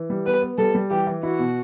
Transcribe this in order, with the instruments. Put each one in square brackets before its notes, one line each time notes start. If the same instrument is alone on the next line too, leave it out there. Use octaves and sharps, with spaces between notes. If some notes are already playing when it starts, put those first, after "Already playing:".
Already playing: [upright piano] E3
G3
[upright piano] B3 [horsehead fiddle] B4
[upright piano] B3
[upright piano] G3 [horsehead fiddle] A4
[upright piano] G3
[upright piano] E3 [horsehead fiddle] G4
[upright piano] E3
[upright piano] E4 [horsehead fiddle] F#4
[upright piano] B2